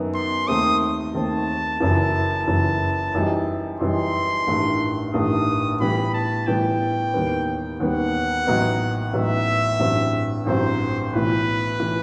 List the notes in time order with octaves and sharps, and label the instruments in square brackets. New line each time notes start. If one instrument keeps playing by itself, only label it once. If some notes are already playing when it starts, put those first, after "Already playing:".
Already playing: [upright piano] F#2 D#3 F#3 B3
[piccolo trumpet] C6
[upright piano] D#2 D#3 A3 C4 [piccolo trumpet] D#6
[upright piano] D#2 D#3 A3 C4 [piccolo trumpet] A5
[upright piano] F#1 F#2 E3
F#1 F#2 E3
F#2 E3 G3 D#4
[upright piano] F#2 E3 G3 D#4 [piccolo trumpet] C6
[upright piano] A1 G2 D#3 A3
[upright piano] A1 G2 D#3 A3 [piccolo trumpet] D#6
[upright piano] A2 E3 G3 B3 [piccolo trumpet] B5
[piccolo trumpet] A5
[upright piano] A2 E3 G3 B3 [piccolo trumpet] G5
[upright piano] D#2 D#3 G3 B3
[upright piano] D#2 D#3 G3 B3 [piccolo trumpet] F#5
[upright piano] A1 A2 F#3 B3 D#4
[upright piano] A1 A2 F#3 B3 D#4 [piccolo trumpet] E5
[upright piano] A1 G2 F#3 C4
[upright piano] A1 G2 F#3 C4 [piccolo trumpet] C5
[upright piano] B1 A2 E3 [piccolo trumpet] B4
[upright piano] A2 E3